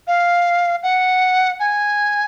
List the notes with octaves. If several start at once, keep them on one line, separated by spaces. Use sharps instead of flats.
F5
F#5
G#5